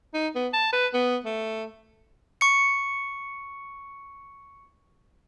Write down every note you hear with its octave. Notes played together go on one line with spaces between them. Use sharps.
D#4
B3
A5
B4
B3
A3
C#6 C#7